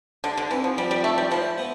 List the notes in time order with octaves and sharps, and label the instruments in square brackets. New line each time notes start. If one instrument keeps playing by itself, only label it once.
[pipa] D3 [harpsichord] G4
[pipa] D3
[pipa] E3 [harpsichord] C4
[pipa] F3
[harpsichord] F3 [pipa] G3
[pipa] G3
[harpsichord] A2 [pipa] A3
[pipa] G3
[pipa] F3 [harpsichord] E4
[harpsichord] B3